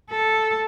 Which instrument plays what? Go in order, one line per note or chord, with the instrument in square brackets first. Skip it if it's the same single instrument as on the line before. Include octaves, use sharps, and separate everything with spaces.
[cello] A4